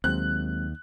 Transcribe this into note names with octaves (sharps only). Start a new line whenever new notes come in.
D#2 F#3 G#3 C4 F#6